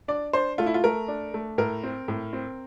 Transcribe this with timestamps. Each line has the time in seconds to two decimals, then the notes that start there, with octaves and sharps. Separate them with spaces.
0.08 D4 D5
0.33 D4 C5
0.58 A3 F4
0.66 E4
0.74 F4
0.84 A3 A#4
1.08 D4
1.34 A3
1.58 A2 A#4
1.83 C4
2.08 A2
2.33 C4